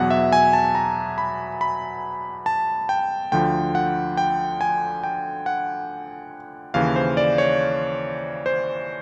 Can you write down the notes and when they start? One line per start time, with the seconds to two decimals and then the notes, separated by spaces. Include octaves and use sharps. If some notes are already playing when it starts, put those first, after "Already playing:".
Already playing: E2 B2 F#3 F#5
0.10 E5
0.32 G#5
0.53 A5
0.75 A#5
1.18 B5
1.61 B5
2.46 A5
2.89 G5
3.32 D2 D3 F3 G5
3.75 F#5
4.17 G5
4.61 G#5
5.04 G5
5.46 F#5
6.74 D#2 C#3 E3 F5
6.96 C5
7.17 D5
7.38 C#5
8.46 C5